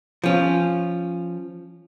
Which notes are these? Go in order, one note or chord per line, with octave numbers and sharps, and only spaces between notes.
F3 C#4